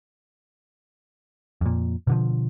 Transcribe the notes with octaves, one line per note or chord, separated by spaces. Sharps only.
F2 A#2
B2 D3 F3